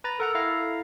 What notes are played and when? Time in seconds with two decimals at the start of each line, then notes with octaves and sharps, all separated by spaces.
0.04 B4 A#5 A6
0.20 A4 A#4 F#5 A#5
0.35 E4 F5 A#5